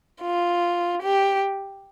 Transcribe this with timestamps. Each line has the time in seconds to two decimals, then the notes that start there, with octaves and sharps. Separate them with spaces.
0.22 F4
1.03 G4